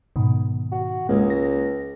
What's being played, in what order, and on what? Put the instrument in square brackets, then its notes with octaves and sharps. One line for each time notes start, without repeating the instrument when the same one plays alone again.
[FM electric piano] G#2 B2 D#3
[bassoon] F#4
[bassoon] C#2 [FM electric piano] G#3 A#3
[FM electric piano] A#6